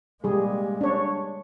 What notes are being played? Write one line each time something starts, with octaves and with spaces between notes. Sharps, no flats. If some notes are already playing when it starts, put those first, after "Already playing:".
A#2 G3 G#3 G#4
D4 C#5